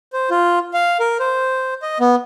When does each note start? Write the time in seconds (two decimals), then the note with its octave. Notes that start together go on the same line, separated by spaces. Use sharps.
0.13 C5
0.30 F4
0.74 F5
1.00 A#4
1.20 C5
1.82 D#5
2.00 B3